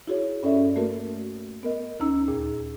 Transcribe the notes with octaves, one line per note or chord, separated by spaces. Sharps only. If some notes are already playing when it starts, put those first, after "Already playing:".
E4 F#4 G#4 C#5
G2 C#4 A4 D5 E5
A3 A#3 F#4 A#4
B3 A#4 D#5
D2 C#4 D#4 A#5 E6
D#2 A#2 G#4